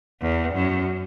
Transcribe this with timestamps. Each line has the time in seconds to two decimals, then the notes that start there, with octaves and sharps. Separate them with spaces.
0.21 E2
0.54 F#2